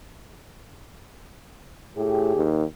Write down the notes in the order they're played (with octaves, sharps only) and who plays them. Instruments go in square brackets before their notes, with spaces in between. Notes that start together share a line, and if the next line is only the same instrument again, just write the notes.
[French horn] A2 [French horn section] G4 G#4
[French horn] D#2